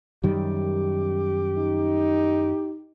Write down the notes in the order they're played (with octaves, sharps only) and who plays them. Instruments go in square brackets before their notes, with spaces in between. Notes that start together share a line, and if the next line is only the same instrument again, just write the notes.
[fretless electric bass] F#2 D#3 G3 [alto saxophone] G4
[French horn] D#4